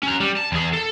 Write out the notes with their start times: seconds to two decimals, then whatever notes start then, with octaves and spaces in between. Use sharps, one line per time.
0.03 C#4 A#5
0.20 G3
0.37 A5
0.52 E2 G#4
0.73 A4